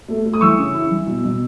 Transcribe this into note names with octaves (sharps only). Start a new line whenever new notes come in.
A3
A3
D#6
E3 C#6 E6
C#3
E4
E3
B2
B2